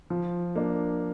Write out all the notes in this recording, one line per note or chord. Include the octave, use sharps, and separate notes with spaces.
F3
A#3 D4